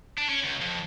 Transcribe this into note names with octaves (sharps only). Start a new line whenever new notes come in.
D4
C#4
C#2
F2